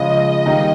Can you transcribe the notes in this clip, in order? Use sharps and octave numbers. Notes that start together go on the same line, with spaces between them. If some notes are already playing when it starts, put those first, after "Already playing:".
Already playing: C#3 F3 G#3 D#5
D#3 G3 A#3 D#4